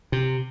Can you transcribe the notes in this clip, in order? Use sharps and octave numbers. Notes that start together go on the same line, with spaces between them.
C3